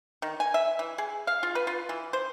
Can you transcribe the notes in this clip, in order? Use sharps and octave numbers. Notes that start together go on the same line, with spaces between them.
D#3
G#5
E5
E3
G#4
F5
F4
B4
F4
E3
C5